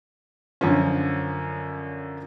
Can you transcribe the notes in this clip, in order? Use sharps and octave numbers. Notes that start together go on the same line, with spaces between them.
F#2 D3 F3 C#4